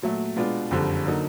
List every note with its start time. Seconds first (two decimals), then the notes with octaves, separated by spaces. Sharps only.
0.02 A#2 F#3 A3
0.36 B2 G#3 B3 D4 F4
0.71 F#1 F2 D3 G3
1.06 D3 F#3 A#3 D#4